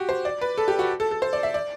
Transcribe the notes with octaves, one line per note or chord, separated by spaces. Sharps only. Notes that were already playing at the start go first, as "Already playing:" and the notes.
Already playing: F#4 G4
C5
D5
B4
A4
G4
F#4
A4
A4
C5
D5
E5
D5